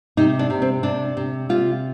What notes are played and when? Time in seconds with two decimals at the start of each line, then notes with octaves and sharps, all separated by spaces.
0.17 C3 D#4
0.39 D4
0.50 C3
0.62 C4
0.83 C3 D4
1.17 C3
1.49 C3 F4